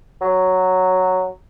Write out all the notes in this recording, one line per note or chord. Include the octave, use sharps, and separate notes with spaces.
F#3